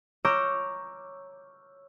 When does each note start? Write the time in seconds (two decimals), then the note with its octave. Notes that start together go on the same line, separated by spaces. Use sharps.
0.25 C#5 A#5 D6 E6 F6 G6